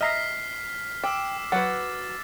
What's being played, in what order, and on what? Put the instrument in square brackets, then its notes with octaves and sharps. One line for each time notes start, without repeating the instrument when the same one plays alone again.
[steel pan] D#5 E5 A#5 [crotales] F6 B6 C7
[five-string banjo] G5 [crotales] D6 E6 E7
[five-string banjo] F#3 B4 [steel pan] C#5 F#5 [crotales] A6